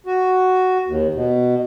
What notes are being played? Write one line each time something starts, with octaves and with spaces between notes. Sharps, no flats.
F#4
D#2
B2